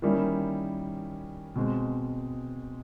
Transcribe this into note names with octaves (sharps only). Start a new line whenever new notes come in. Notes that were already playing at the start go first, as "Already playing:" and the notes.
D#3 G3 A#3 C#4 E4
B2 G#3 C4